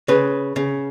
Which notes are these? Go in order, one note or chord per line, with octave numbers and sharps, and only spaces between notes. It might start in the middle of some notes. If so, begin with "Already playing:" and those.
C#3 B4
C#3